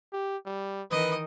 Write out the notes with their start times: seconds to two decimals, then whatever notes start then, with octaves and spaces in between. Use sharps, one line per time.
0.13 G4
0.46 G3
0.91 D#3 E3 B4 D#5